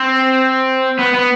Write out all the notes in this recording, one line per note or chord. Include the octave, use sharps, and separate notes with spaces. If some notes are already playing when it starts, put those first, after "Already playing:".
Already playing: C4
B3
B3